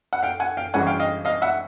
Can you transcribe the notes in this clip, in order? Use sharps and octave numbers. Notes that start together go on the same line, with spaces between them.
F#5
F5 G5
F#5 G#5
F5 G5
G#1 G2 E3 G#3 C#4 F#5 G#5
F5 G5
D#5 F5
D#5 F5
E5 F#5